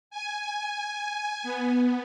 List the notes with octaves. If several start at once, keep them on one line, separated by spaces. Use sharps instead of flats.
G#5
B3